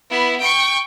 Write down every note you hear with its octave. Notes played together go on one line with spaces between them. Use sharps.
B3 E4
G5 C#6